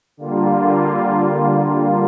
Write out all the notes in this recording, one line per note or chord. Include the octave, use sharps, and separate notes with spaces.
D3 G3 A#3 F4